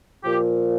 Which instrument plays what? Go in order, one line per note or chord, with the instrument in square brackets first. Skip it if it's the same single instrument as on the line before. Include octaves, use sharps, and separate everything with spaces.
[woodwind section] A#2 F3 G4